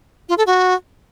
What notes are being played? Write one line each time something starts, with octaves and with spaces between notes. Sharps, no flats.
F4
A4
F#4